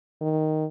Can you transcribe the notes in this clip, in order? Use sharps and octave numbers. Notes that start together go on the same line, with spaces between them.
D#3